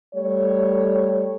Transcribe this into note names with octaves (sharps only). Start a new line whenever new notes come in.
G3 A3 C#5